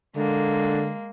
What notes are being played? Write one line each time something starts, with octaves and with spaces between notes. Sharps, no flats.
D3 G#3 A#3